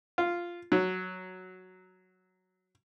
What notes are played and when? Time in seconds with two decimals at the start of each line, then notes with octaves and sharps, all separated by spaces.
0.18 F4
0.72 F#3